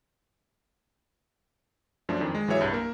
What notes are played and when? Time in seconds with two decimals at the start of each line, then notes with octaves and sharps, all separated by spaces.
2.09 F#2 F3 A3 D4
2.20 F2 D#3
2.35 G#3
2.48 A1 E3 F#3 G#4 C#5 E5
2.61 C2 G2
2.73 A#3 A#4